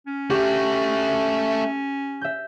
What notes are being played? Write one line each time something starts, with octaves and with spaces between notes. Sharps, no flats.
C#4
A3 F#4 G4 C#6
E5 G6